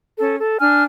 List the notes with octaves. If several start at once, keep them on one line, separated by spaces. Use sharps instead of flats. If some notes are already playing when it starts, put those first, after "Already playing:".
C#4 A4
A4
D4 G#5 F6